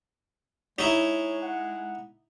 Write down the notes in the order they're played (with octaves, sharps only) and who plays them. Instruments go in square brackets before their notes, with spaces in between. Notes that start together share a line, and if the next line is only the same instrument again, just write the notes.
[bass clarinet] G#3 [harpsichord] D#4 E4 [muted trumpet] C#5
[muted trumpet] F#5